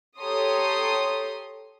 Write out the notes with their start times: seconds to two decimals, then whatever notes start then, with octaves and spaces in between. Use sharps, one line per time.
0.21 G4 A4 C#5 A#5 C6 D#6